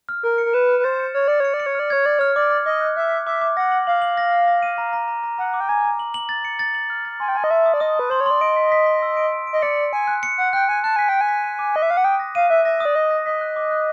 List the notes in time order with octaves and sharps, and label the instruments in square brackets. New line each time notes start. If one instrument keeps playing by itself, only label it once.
[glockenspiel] F6
[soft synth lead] A#4 [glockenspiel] F6
[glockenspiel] C#7
[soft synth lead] A#4
[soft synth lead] B4 [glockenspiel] E7
[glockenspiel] F6
[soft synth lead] B4
[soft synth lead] C5 [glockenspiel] A6
[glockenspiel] C#7
[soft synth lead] C#5 [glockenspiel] F6
[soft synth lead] D5 [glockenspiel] C#7
[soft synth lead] C#5 [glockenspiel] C#7
[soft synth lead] D5
[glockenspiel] C#7
[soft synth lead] C#5
[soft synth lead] D5 [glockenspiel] F6
[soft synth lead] C#5 [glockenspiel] G#6
[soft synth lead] D5 [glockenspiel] G#6
[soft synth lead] C#5 [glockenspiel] F6
[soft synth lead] D5 [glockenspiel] D6
[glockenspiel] D6
[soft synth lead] D#5 [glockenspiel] D6
[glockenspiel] F#6
[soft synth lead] E5 [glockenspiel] F#6
[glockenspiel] D6
[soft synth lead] E5 [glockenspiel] D6
[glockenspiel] D6
[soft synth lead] F#5 [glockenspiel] A#6
[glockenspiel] F#7
[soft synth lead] F5 [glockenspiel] F#7
[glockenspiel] F#7
A#6
F6
A#6
D#7
A#5
A#5
A#5
A#5
[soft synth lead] F#5 [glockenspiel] A#5
[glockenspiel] D6
[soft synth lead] G5
[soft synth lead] G#5 [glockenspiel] A#5
[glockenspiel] A#5
F#7
F#7
A6
C#7
A6
F#7
F6
A6
[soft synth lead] G#5 [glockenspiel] C6
[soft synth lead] G5
[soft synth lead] G#5 [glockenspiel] A5
[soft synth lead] D#5
[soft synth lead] E5 [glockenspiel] A5
[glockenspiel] D#6
[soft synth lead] D5
[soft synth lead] D#5 [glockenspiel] D#6
[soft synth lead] B4 [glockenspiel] A5
[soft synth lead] C5 [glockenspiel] C6
[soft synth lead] C#5
[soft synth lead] D5 [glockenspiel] C6
[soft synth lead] D#5 [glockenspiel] D7
[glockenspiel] B6
B6
B6
E6
D7
D7
D7
[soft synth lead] D#5
[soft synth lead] D5 [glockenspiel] C#7
[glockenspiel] C#7
[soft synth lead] G#5 [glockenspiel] C#7
[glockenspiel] F#6
C#7
[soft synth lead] F#5 [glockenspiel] F#6
[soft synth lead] G5 [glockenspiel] F#6
[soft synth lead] G#5 [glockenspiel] C#7
[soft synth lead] A5 [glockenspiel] F#6
[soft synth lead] G#5 [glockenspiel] B6
[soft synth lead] G5
[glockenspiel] B6
[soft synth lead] G#5
[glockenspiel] B6
D#7
D6
[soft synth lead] D#5 [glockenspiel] D#7
[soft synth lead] E5
[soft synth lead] F5 [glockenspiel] F#6
[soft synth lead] F#5
[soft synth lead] G5 [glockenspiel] D#6
[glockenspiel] A#6
[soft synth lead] F5 [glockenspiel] D#7
[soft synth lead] E5 [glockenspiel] F#6
[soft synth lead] E5 [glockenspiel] A#6
[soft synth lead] D5 [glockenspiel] D#6
[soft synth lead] D#5 [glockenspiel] D#6
[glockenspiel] A#6
[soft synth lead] D#5 [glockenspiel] B6
[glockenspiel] F#6
D6
F#6